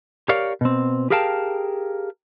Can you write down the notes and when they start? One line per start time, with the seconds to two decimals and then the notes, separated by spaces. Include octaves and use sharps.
0.29 G4 A#4 C#5 D5 F5
0.61 B2 C4
1.10 G4 G#4 A#4 F5 G5 A5